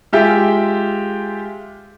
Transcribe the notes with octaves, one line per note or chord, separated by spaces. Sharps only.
G#3 F4 G4 E5 G5